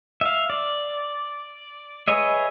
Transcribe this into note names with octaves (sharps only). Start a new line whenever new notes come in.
E5 F5
D5
G#4 B4 C#5 D#5 E5